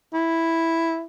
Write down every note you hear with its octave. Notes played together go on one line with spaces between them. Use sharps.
E4